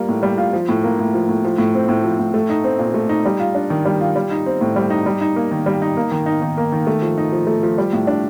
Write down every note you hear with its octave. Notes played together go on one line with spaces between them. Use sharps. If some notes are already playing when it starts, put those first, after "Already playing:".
Already playing: G3 A#3 F4
A2
G3
F4
F3
A2
A#3
A2
F3
A2
F3
A2
C4
A2
F3
A2
A3
D#4
C4
A#2
A3
D#4
G3
F4
D4
D#3
G3
F4
G3
D#4
C4
A2
G3
D#4
G3
D#4
A#3
D#3
G3
D#4
A#3
D#3
D#4
D#3
A#3
D#3
A3
F3
D#4
F3
A3
F3
G3
A2
D4